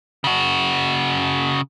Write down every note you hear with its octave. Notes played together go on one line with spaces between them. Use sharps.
C#3 F#4